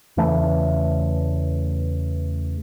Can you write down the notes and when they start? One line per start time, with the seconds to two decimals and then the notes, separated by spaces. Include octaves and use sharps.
0.17 E2 C#3 E3 A3